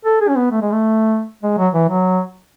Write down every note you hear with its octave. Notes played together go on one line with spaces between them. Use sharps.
A4
G#4
C#4
B3
A3
G#3
A3
G#3
F#3
E3
F#3